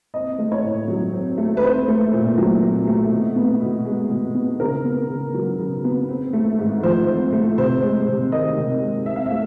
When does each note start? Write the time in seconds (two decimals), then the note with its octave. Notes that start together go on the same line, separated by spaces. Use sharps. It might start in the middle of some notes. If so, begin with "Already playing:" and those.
0.14 C4 D#5
0.39 A3
0.52 C#5
0.63 A2
0.88 F#3
1.13 C4
1.37 A3
1.57 B4
1.62 C4 C5
1.88 A3
2.13 A#2
2.38 F#3
2.62 C4
2.87 A3
3.12 B2
3.36 B3
3.61 B2
3.85 G#3
4.10 B2
4.35 B3
4.60 C#3 A#4
4.85 B3
5.09 C#3
5.34 F#3
5.59 C#3
5.84 B3
6.09 C4
6.33 A3
6.59 G#2
6.83 F3 C5
7.07 C4
7.33 A3
7.58 C3 C5
7.82 G#3
8.08 C3
8.32 D#3 D#5
8.57 C3
8.81 G#3
9.06 C4 E5
9.16 F5
9.26 A3 E5